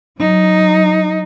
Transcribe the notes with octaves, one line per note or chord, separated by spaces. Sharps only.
F#3 D#4